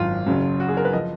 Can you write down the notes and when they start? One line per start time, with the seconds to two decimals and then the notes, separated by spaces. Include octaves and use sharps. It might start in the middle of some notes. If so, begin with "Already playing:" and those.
Already playing: G#1 F#2 D#3 F#3 F4
0.26 F#1 F#2 C#3 F#3
0.60 F#4
0.68 G#4
0.77 A#4
0.85 B4
0.93 F3 D#5